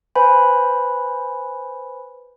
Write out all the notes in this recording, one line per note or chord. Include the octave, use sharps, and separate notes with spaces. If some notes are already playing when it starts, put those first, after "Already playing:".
B4 C5 G#5 B5